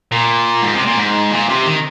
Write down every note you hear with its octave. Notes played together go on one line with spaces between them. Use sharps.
A#2
G#2
C3
A#2
G#2
A#2
C3
D#3